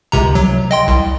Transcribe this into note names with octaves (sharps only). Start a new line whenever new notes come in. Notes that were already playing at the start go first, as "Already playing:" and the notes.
C#2 C3 A#5
F#3
D#5 G5 C6
C2